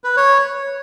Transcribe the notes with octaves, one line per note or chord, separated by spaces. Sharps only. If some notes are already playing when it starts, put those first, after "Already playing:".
B4
C#5